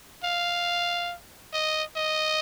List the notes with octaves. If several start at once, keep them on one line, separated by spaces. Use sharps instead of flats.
F5
D#5
D#5